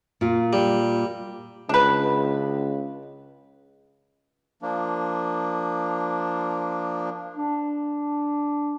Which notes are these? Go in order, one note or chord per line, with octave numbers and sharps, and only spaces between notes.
A#2 F4
G3
C#2 D4 B4
F3 A#3 D4
D4